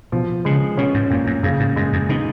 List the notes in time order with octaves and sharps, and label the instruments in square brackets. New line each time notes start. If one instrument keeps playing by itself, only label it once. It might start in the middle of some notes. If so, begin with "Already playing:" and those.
[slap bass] B2 [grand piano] F3
[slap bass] C#3 [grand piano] G#3
[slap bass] B2 [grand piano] C#4
[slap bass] G#2
[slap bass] F#2 [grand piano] A#2
[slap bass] F#2
[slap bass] F#2 [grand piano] C#3
[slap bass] G#2
[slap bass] F#2 [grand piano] G#3
[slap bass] F2
[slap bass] B2 [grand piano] D#4